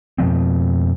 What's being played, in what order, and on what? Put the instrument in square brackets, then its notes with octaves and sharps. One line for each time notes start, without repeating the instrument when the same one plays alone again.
[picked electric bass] F2 B2 F3 C4